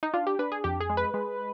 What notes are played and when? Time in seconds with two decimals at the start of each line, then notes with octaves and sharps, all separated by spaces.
0.03 D#4
0.14 D4 F4
0.27 G4
0.39 D4 B4
0.52 G#4
0.64 F2 G4
0.80 G#4
0.90 G#3
0.97 B4
1.14 G#3